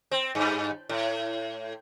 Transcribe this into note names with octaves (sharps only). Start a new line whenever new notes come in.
C4
G2
A2